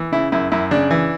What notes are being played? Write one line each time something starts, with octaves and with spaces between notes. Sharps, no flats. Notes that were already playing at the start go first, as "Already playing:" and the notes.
Already playing: E3
C#3 E4
F#2 E4
F#2 E4
C#3 D4
E3